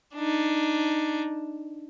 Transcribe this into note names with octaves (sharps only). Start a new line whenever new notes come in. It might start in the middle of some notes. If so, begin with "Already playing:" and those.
D4 D#4